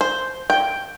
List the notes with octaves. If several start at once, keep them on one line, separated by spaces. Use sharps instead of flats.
C5
G5